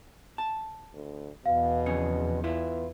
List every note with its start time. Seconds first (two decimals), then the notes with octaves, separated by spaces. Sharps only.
0.38 A5
0.93 D2
1.46 E2 B2 F5
1.86 F2 C#3 G#4 C#7
2.44 E3 B3 E4 F4